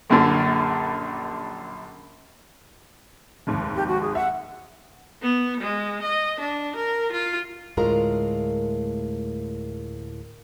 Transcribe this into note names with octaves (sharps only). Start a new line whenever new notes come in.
A#1 F#2 A#2 D3
F1 D#2 G#2
G4
F#4
G#4
E5 F#5
B3
G#3
D#5
D4
A#4
F4
D2 A2 G#3 F4 A#4 A#5